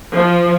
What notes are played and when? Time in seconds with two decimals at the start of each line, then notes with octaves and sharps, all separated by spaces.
0.14 F3